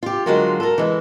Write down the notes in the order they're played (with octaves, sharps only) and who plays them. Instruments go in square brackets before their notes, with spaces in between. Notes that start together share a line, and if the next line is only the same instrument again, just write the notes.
[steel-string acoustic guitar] F4 G4
D3 F#3 G#3 F4 F#4 A#4
A4 A#4
E3 G#3